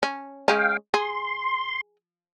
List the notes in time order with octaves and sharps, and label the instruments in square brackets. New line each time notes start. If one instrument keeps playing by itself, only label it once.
[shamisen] C#4
[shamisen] G#3 C#4 [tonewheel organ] F5 G5
[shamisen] G#4 [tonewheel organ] C6